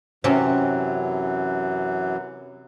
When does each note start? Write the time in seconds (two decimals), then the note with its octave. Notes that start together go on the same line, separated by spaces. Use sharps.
0.24 F#2 C3 E3 F#3 C4 C#4